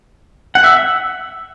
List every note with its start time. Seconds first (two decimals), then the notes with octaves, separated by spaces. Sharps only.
0.55 F#5
0.64 E5